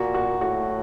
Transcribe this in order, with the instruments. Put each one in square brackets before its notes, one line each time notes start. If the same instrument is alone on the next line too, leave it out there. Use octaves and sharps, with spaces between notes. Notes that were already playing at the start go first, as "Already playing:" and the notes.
Already playing: [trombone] A#2 [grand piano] F#4
[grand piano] F#4
[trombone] A2 [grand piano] F#4